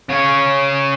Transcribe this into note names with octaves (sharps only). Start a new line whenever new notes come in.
C#3 C#5